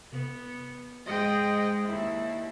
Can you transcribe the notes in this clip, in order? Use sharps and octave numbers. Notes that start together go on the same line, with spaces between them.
C3 B3
G#2 G#3 D#5 G5
D#2 E4